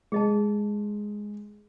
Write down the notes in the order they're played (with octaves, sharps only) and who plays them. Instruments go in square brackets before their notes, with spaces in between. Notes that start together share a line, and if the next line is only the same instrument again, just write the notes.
[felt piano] G#3 [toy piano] G#4 D#5 A5